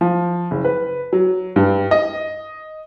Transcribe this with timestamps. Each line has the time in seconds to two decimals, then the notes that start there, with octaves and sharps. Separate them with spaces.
0.01 F3
0.51 F#1
0.64 B4
1.13 F#3
1.56 G2
1.91 D#5